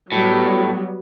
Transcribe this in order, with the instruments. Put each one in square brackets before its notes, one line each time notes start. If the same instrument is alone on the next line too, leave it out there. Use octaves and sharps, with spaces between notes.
[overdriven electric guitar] A2 [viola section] F#3 G3 B3